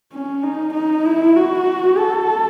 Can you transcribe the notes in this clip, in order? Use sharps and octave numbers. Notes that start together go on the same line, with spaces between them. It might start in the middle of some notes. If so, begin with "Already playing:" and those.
C#4
D#4
D#4
E4
F#4
A4